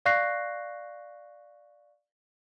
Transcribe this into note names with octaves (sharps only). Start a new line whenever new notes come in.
D5 F5 C#6 F#6 A#6 C7